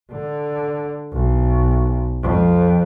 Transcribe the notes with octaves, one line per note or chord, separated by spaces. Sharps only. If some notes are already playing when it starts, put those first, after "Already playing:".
D3
B1
F2